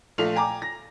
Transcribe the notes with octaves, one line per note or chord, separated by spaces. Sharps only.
A#1 A3 F4 F7
G5 G#5 A#5 D6
A#6